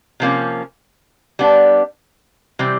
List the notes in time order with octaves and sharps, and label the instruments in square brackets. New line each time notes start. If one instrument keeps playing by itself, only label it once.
[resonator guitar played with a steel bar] C3 F3 A#3 C#4
G3 B3 D4
C3 E3 G3 C4